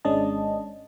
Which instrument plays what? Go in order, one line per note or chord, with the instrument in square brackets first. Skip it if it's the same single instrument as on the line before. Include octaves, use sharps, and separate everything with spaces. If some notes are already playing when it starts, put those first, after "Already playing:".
[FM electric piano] G#1 G#3 C#4 D4 D#5 A5